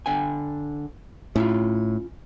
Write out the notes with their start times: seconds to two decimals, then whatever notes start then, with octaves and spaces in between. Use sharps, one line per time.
0.06 D3 G5 G#5
1.36 A2 C#4 E4 F4